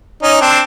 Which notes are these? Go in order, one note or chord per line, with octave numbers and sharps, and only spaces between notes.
C#4 D#4
C4 D4